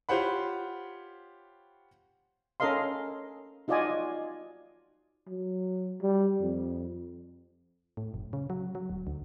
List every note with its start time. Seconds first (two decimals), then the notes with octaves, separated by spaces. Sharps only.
0.09 F4 G4 C5 C#5 F#5 B5
2.60 C#4 A4 A#4 D#5 F5 C6
3.68 D#4 F4 F#4 D5 D#5 G#5
5.28 F#3
6.02 G3
6.40 F2
7.97 A2
8.14 F#1
8.33 C#3
8.50 F#3
8.75 F#3
8.89 D1
9.07 D2